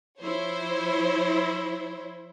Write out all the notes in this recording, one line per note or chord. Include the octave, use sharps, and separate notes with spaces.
F3 E4 C5 C#5